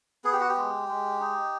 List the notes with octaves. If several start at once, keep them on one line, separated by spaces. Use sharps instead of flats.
B3 G#4
G4
F#4
G4
G#3
G#3
D#4